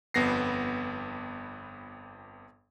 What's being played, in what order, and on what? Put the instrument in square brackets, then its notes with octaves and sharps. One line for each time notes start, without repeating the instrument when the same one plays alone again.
[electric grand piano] G1 F2 B3 A#6 C7